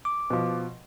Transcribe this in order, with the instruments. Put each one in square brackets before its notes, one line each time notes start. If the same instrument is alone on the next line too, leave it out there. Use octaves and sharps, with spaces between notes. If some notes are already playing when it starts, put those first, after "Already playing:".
[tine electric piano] D6
[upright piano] B2 F3